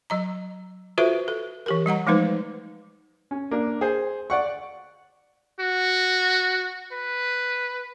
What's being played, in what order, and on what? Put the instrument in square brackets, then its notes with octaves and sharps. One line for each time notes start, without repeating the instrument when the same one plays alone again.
[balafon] F#3 D#5 A#5
F4 F#4 A4 B4 C5 E5
A4
E3 G4 A#4
G3 D#5 F#5 A#5
F3 G#3 A3 D#4 B4 C5
[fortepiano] C#4
A#3 D4
G#4 C5
D5 F#5 C#6
[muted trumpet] F#4
B4